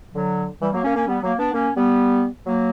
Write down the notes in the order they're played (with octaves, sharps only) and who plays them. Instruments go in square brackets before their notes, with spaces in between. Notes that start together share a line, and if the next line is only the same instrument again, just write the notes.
[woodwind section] D3 F#3
E3 G3
F#3 A#3
A#3 C#4
A#3 C#4
G3 B3
F#3 A#3
B3 D4
A#3 C#4
G3 B3
F#3 A#3